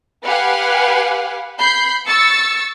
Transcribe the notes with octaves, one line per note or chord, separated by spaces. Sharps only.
G4 B4 F5 F#5 G#5
B5 G6 C7
C#6 E6 A6 C#7